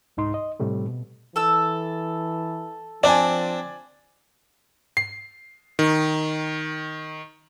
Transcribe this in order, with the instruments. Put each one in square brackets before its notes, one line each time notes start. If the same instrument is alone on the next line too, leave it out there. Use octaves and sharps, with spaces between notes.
[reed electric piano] C2 G#2 D#4 C6
D#5
A2 C3 G3 A3
B2
[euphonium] E3 [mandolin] A4 E6
[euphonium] F3 [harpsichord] C4 D4 [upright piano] D5 G#5
[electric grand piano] C7
D#3